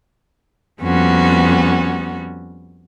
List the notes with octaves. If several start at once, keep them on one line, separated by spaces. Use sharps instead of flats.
F2 G3 B3 C#4 F#4